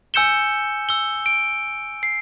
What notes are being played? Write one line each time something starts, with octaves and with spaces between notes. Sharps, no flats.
G#5 E6 G6 C#7 E7 G7
E6 G7
D7
C7